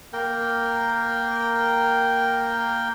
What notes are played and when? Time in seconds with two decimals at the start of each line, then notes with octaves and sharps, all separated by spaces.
0.13 A#3 A#4 G5